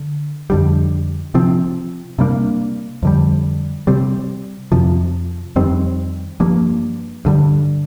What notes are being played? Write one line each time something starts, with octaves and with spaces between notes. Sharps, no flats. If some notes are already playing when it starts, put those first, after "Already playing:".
Already playing: D3
F2 D3 G3
C3 F3 C4
C3 G3 A#3 D4
F2 D3 G3
C3 G3 C4
F2 C3 F3
F2 D#3 G3 C4
G2 F3 A#3
G2 D3 G3